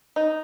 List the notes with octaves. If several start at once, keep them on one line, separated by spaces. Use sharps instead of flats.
D#4